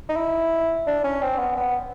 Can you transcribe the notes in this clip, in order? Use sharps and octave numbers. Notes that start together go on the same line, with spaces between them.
D#4
E4
D4
C#4
C4
B3
B3